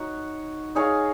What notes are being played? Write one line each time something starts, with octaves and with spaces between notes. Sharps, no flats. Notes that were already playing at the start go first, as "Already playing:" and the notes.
Already playing: D#4 F#4 C#5
D#4 G#4 C#5 F5